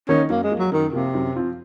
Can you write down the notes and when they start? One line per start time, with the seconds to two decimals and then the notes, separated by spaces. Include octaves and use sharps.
0.09 D#3 A#3 C#4 D#4
0.30 F#2 A#3
0.44 G#3
0.51 F3 A#3 F4
0.59 F#3
0.72 F#2 D#3
0.93 C3 F3 A#3 F4
1.14 F#2
1.36 F3 C4 F4